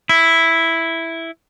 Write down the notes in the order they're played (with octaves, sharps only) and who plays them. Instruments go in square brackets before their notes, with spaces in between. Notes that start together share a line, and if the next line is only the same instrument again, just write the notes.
[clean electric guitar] E4